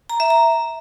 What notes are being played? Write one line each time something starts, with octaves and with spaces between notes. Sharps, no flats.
A#5
E5
A#5